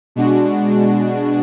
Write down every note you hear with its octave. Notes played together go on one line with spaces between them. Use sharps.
B2 G#3 D4 F#4